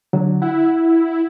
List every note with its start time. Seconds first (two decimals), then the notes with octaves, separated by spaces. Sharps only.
0.13 D3 F#3
0.42 E4 F#5